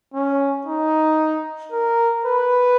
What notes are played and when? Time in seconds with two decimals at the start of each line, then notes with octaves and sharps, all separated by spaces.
0.14 C#4
0.66 D#4
1.72 A#4
2.25 B4